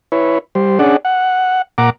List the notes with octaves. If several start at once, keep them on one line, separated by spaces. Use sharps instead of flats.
E4 B4 C#5
G3 C5
C#4 D4 G#4 D5 F#5
F#5
A#2 F#5 A#5 D6